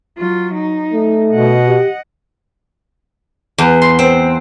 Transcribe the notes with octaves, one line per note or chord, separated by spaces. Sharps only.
F#3 F4
D#4
A3
B2 D#5 F#5
G4
E2
C6
C4